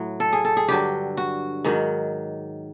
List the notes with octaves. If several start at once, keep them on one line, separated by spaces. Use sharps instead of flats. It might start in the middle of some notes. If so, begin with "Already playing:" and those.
Already playing: A2 F#3
A4
G#4
A4
G#4
G2 D3 F#3 G4
F#4
G#2 D#3 F#3